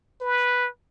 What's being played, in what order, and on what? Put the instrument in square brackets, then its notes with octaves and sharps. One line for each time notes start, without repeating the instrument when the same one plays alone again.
[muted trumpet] B4